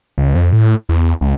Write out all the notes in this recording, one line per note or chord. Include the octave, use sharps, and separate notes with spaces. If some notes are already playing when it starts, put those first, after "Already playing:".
C#2
F2
A2
E2
C#2